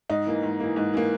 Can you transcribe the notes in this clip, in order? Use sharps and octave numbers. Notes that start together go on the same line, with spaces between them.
G#2 D#4
E3 A#3
G#2
E3 A#3
G#2
E3 A#3